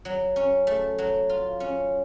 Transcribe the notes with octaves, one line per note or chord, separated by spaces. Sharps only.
F#3
C#4
A3
F#3
F4
C#4